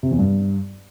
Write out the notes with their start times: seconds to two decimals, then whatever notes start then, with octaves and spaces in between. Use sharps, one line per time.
0.03 C3
0.11 E2
0.19 G2